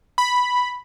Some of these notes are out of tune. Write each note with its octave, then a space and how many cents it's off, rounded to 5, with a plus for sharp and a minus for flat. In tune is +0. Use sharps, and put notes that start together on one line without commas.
B5 +0